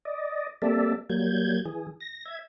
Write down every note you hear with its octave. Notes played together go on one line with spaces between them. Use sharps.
D5 D#5
G3 A#3 C4 A4 D5 E5
F#3 G3 A#3 G6 G#6
E3 G#4
A#6
E5 G#6